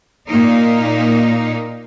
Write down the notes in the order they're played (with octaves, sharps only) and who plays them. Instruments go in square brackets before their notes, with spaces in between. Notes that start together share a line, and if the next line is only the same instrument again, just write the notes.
[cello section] A#2 A#3 D#4